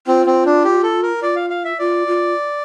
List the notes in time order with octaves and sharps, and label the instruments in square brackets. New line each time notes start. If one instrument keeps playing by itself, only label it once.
[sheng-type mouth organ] C4 [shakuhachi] F4
[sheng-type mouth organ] C4
D4
G4
A4
A#4
[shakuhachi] F4 [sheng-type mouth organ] D5
[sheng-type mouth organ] F5
F5
E5
[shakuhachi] F4 [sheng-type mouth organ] D5
[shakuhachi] F4